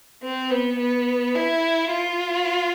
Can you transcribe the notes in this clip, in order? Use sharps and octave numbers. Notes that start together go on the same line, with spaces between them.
C4
B3
B3
E4
F4